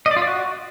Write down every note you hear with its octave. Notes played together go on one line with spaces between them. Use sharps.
D#5
D5
F4
D5
F#4